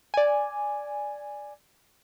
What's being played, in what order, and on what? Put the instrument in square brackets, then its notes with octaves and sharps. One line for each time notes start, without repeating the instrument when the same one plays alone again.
[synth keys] D5 G#5